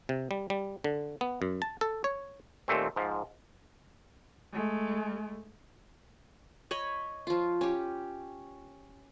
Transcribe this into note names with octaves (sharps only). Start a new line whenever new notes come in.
C3
G3
G3
D3
B3
F#2
A5
A4
C#5
D#2 A#2 A3 C4
G#2 F3
G#3 A3
C#5 D#5 B5
F3 F4
C#4 G4